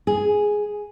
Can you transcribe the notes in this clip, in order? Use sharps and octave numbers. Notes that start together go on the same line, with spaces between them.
G#4